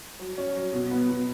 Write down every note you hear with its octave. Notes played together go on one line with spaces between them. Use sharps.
F#3
C#4
F#3
B2
B3
B2